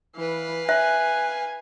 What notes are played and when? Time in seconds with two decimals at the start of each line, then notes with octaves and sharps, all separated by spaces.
0.16 E3 B4 F5
0.69 E5 G#5 F#6